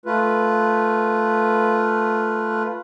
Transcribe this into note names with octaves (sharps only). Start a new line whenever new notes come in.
A3 F4 B4